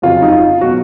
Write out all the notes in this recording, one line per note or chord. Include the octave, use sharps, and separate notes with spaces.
F2 C#3 F#3 F4
D#4
F4
B2 F#3 F#4